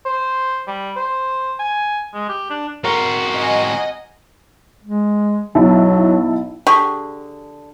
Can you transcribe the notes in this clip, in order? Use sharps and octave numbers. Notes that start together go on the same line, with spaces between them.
C5
G3
C5
G#5
G#3
G4
D4
C4 F#4 A#4
D#5 F#5 G#5
G#3
B1 F#3 E4 A5
D3 G4 G#4 C#6